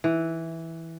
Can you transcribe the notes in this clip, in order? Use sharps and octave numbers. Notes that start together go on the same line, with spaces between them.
E3